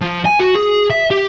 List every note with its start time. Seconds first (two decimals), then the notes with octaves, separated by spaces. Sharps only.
0.01 F3
0.26 G#5
0.40 F#4
0.55 G#4
0.90 E5
1.11 G4